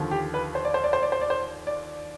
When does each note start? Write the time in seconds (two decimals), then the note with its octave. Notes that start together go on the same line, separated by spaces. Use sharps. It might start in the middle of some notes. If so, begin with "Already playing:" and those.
Already playing: D#2 D3 F3
0.11 G4
0.34 B4
0.55 C5
0.65 D5
0.74 C5
0.84 D5
0.93 C5
1.03 D5
1.12 C5
1.21 D5
1.30 C5
1.67 D5